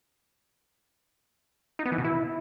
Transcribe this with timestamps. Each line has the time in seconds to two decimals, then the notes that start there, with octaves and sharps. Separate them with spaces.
1.79 D#4
1.85 B3
1.92 E3
1.98 B2
2.04 E4